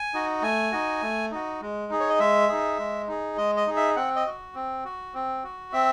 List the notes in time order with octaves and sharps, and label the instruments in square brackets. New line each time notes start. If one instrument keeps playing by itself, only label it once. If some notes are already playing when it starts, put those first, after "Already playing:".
Already playing: [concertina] G#5
D#4 F#4
A3 G#5
D#4 F#4
A3
D#4 F#4
G#3
D#4 G#4
C#5
D#5
G#3 E5
D#4 G#4
G#3
D#4 G#4
G#3 D#5
D#5
D#4 G#4
E5
C4 F#5
D#5
F#4
C4
F#4
C4
F#4
C4 E5